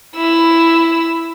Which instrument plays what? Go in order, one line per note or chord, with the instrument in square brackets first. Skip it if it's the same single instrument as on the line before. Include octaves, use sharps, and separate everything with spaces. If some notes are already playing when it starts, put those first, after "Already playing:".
[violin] E4 E6